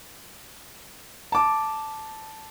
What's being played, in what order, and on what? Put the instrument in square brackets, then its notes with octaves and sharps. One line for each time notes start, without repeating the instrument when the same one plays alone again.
[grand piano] A5 D6